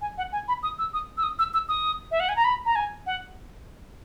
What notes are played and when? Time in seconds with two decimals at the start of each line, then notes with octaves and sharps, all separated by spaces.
0.01 G#5
0.18 F#5
0.32 G#5
0.48 B5
0.63 D#6
0.78 E6
0.93 D#6
1.17 E6
1.23 D#6
1.39 E6
1.54 E6
1.69 D#6
2.11 E5
2.20 F#5
2.29 G#5
2.36 A#5
2.45 B5
2.66 A#5
2.75 G#5
3.06 F#5